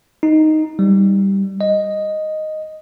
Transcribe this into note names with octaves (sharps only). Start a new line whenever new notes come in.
D#4
G3
D#5